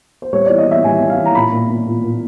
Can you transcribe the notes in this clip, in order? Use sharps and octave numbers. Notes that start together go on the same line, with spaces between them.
C5
G3 C#5
E3 D5
D#5
E3 E5
G3 G#5
G3
F5
E3
A#5
A#2 B5
A#2
A#2
A#2
A#2